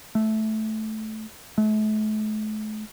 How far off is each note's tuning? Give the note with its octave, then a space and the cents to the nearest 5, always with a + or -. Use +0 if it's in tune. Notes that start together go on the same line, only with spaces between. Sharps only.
A3 -10
A3 -40